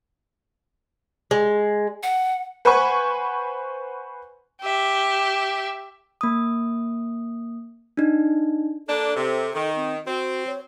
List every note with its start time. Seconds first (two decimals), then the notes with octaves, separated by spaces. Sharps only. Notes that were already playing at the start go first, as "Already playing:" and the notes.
1.31 G#3
2.03 F#5
2.65 B4 C5 F#5 G#5 B5 C#6
4.63 G4 E5
6.21 A#3 D#6
7.97 D4 D#4
8.88 A#3 D4 A4
9.16 C3
9.54 D#3 A4
9.76 C4
10.06 C4 F#4
10.47 C#5